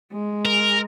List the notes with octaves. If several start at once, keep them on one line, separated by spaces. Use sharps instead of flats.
G#3
A#4